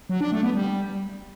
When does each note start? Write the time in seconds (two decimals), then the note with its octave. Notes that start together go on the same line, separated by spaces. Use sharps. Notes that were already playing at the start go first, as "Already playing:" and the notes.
0.09 F#3
0.21 D4
0.32 A3
0.43 B3
0.54 G3